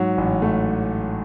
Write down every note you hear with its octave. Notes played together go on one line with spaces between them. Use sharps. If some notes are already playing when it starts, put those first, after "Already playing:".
Already playing: G#2 F#3
A1
A3